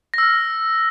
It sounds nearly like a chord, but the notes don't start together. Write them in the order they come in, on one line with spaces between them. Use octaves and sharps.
A#6 E6 F6